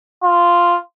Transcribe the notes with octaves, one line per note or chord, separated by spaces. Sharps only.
F4